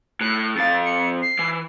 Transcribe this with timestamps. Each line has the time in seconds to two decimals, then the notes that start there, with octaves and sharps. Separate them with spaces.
0.21 A2 F#6
0.56 F2 F5 A6
0.85 C#7
1.22 C7
1.39 E3